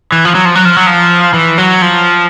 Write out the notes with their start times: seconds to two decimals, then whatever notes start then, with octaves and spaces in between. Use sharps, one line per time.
0.12 E3
0.25 F3
0.35 F#3
0.45 F3
0.55 F#3
0.65 F3
0.76 F#3
0.87 F3
1.34 E3
1.58 F#3
1.82 F3